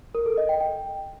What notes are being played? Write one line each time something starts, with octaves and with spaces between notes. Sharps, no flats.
A#4
A4
D#5
G5
G5